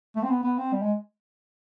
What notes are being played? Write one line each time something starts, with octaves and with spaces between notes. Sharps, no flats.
A3
C4
B3
B3
C4
G3
G#3